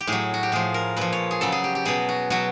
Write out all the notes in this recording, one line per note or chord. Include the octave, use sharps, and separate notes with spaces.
G4
A2 F#3 G#4
F#4
G4
A2 F3 G#4
A#4
A#2 F3 B4
C#5
G#4
C#3 F#3 A4
G#4
G4
G4
B2 F#3 G#4
F#4
B2 F#3 F#4